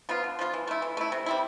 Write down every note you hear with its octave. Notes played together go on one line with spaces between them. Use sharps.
F3 B3 F4
D3
F3 B3 F4
E3
A3 E4
E3
A3 E4
C3
G3 C4 E4